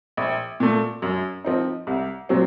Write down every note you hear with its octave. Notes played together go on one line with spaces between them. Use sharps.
A#1
A#2 A3
F#2
F3 C4 D#4
C2
A#2 F#3 C4